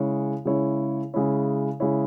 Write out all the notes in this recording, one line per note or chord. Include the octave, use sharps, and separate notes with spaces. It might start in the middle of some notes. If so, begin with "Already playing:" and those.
Already playing: C#3 G#3 E4 C#5
C#3 G#3 E4 C#5
C#3 G#3 E4 C#5
C#3 G#3 E4 C#5